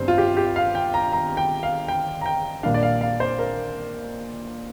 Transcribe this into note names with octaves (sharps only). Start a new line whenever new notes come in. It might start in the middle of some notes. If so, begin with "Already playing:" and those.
Already playing: G1 G2 G3 C4 C5
F4
G4
G4
F5
G5
A#5
A#5
G5
F5
G5
A#5
G5
A#1 A#2 G3 D4 F5
D5
F5
F5
C5
A#4